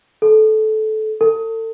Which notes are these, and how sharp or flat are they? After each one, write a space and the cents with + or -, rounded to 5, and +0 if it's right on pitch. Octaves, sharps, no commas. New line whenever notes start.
A4 -20
A4 +35